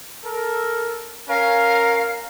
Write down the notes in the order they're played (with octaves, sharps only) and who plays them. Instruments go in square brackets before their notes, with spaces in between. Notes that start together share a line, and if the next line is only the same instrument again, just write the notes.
[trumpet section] A4 A#4
[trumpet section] C#4 A#4 [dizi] F5